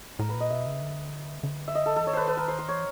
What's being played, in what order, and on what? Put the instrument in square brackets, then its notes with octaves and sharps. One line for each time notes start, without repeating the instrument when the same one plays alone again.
[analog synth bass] A2 [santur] A#4
[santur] B4
[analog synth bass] A#2
[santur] D#5
[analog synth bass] B2 [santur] E5
[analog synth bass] C#3
D3
D3
[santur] E5
D#5
A4
[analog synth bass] E3 [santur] A4
[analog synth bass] D#3 [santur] C#5
[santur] B4 C5
B4
A#4
C5
C5
[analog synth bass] E3 [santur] C#5